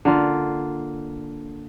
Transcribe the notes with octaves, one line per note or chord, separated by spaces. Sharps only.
D3 A#3 F4